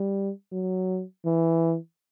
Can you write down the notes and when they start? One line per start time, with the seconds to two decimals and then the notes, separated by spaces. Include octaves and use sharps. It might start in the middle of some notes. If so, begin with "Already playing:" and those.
Already playing: G3
0.52 F#3
1.25 E3